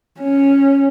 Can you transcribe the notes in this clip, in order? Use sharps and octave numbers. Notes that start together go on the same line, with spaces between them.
C#4